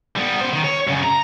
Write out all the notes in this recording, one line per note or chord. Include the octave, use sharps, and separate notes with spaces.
G3 B3
B3 C5
D#3
C#5
F#2 C#3
A#5